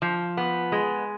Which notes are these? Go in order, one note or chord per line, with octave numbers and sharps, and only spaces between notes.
F3
B3
G#3